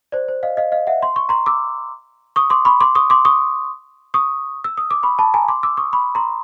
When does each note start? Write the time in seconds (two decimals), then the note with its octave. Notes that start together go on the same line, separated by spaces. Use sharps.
0.12 C5 D5
0.28 C5
0.43 D#5 F5
0.57 D#5 F5
0.72 D#5 F5
0.87 E5 F#5
1.03 C6
1.16 C#6
1.29 A#5 C6
1.46 D6 E6
2.36 C#6 D#6
2.50 C6 D6
2.65 B5 C#6
2.81 C6 D6
2.95 C#6 D#6
3.10 C6 D6
3.25 C#6 D#6
4.14 C#6 D#6
4.64 E6
4.77 D#6
4.91 D6
5.03 B5 C#6
5.19 A5 B5
5.34 G#5 A#5
5.48 C6 D6
5.63 D6 E6
5.77 C#6 D#6
5.93 B5 C#6
6.15 A#5 C6